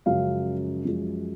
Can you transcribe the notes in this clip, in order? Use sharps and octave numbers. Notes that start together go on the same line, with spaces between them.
F#2 C#3 F3 G#3 F5
F#2 F3 G#3